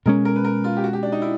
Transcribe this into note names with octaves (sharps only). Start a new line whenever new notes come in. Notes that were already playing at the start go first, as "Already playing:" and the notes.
B2 G#3 C#4 A#4
A#4
B4
A#4
F4
G4
F#4
G4
D4
D#4
E4